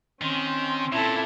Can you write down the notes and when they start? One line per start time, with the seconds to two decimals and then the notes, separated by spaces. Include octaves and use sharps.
0.22 D#3 C4 C#4 C6
0.92 A#2 E4 A4